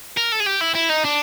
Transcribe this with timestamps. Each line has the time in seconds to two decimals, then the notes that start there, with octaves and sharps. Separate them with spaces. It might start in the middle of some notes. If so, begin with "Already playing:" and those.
0.17 A#4
0.32 A4
0.40 G#4
0.46 G4
0.61 E4
0.75 E4
0.90 D#4
1.05 D4